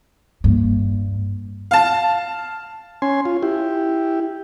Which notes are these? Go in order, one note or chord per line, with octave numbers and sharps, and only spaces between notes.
G2 A#3
F5 A5
C#4 G#5 C6
F4
E4 G4